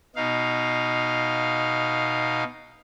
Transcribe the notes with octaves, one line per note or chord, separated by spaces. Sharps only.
B2 D#4 F5